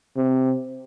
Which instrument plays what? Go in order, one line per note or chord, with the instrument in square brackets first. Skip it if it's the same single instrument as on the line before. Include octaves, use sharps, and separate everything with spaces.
[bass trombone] C3